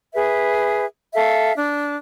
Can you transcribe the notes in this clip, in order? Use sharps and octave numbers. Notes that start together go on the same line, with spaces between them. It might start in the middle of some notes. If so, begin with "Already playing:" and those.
G#4 B4 E5
A4 E5 F5
D4